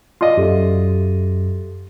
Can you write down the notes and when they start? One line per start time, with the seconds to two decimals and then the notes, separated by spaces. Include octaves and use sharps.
0.21 F4 D5 D#5
0.37 F#2 G4 A4 E5